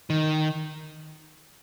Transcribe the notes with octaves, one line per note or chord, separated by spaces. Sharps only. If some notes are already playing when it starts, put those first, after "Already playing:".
D#3